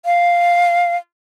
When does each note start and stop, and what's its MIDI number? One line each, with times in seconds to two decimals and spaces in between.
0.05 0.96 77